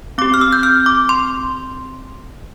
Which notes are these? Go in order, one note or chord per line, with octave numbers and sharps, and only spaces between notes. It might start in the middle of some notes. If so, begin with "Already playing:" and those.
C4 G4 D6
F6
E6
G6
F6
D6
C6